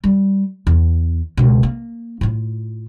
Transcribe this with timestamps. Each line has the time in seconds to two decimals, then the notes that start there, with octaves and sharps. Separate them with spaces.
0.04 G3
0.67 E2
1.37 C#2 B2
1.63 A#3
2.21 A2 F4